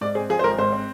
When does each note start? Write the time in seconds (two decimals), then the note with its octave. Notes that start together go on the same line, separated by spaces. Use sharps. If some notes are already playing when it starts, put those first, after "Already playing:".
0.01 G#2 D5
0.15 C4 G#4
0.30 F3 G#4
0.39 C5
0.44 G#1 A#4
0.58 G#2 C5
0.73 C4